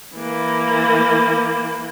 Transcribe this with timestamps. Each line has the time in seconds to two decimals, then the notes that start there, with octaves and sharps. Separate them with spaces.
0.16 E3 A#3